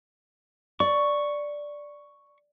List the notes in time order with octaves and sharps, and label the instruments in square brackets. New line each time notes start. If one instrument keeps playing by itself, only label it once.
[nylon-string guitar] D5 [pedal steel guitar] C#6